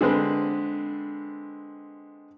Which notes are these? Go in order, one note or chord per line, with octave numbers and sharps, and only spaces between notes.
D3 G#3 C4 D4 B4